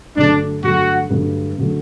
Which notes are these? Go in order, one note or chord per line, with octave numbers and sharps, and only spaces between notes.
G2 D3 F#3 A3 D4
G2 D3 F#3 A3 F#4
G2 D3 F#3 A3
D3 F#3 A3